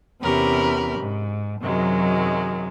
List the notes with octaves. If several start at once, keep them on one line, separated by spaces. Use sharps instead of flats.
E2 C3 C#4 G4 A#4 B5
G#2
F#2 C3 D#3 F#3 G#3